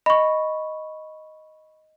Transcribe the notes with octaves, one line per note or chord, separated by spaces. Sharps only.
D#5 B5 C#6